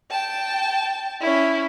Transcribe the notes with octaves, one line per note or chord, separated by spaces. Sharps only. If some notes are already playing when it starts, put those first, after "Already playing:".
G5 A5
C#4 E4